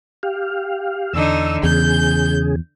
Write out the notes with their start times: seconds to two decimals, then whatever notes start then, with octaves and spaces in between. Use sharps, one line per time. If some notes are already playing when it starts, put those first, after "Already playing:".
0.23 G4 F5
1.13 E2 D3 D#4 E6
1.63 E2 C#3 G#4 G6